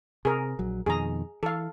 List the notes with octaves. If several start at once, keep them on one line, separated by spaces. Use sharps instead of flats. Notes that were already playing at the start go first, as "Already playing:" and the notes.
C3 G#4 A#4
A#1 F#3
F2 B2 D#3 G#4 A#5
E3 A4 F5